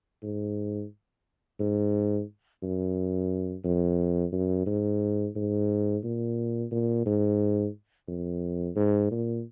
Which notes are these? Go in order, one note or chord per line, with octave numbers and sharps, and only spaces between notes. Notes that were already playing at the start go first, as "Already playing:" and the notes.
G#2
G#2
F#2
F2
F#2
G#2
G#2
A#2
A#2
G#2
F2
G#2
A#2